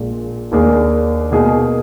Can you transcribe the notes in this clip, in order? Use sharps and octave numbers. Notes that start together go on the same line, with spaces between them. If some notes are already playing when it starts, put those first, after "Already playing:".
Already playing: A#1 A#2 G#3
D#2 D#3 A#3 D4 G#4
B2 A#3 D#4 G#4